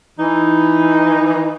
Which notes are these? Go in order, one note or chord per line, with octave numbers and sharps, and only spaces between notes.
E3 D#4